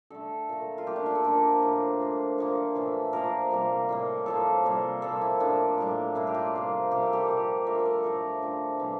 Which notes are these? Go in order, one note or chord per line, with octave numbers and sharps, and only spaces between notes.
D3 A3 A4
A#2 A3
F4
A#2 A3 G4
D4
F4
A4
D3 F3 A#3 A#4
A2 F3 A#3
A2 F3 A#3
D3 F3 A#3
A2 E3 A3
A#2 F3 A#3 A#4
C3 G3 A#3
A2 G3 A#3
A2 F3 A#3 A4
C3 G3 A#3
A#2 F3 A#3 A4
E4
A2 F3 A#3 D4
A2 G3 A#3
A2 G3 A#3 E4
G4
F4
C3 F3 A#3
C3 G3 A#3 G4
A4
G4
A#2 F3 A#3
D3 F3 A3 A#4
A4
A#4
A2 F3 A3 A#4
D3 F3 A3
C3 E3 G3 A#3